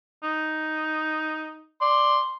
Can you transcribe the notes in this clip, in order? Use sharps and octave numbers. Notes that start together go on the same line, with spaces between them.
D#4
D5 C6